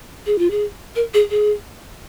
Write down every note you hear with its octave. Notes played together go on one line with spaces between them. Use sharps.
G#4
F4
G#4
A#4
G#4
G#4